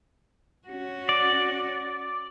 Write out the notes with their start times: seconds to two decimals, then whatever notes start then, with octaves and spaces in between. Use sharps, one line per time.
0.68 C#4 F#4
1.09 D5